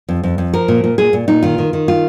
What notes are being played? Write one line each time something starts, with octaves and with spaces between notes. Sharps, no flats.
F2
F2
F2
F3 A#4
A#2
A#2
A#2 G#4
A#2
A#2 D#4
D#3 F4
D#3
D#3
F4